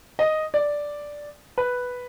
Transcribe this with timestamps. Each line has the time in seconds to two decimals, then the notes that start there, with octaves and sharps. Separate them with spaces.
0.19 D#5
0.54 D5
1.58 B4